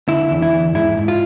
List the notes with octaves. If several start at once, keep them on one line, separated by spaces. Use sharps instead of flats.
D3 E4
E2
E4
E2
G#2 E4
G#2
F4